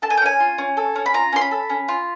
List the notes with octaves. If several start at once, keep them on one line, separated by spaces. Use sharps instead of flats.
A4 A5
G#5
G5
C#4 G#5
F4
C#4
A4
C#4
B5
F4 A#5
C#4 C6
B5
A4
C#4
F4